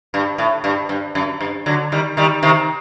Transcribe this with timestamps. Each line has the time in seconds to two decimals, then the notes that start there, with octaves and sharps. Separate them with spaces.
0.14 G2
0.38 A2
0.64 G2
0.89 G2
1.15 F#2
1.41 G2
1.66 D3 F#3
1.92 D#3 G3
2.17 D#3 G3
2.43 C3 D#3